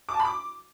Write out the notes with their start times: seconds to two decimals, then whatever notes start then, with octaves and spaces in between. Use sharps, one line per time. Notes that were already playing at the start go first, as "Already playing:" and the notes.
0.09 D6
0.14 A5
0.20 B5
0.25 D6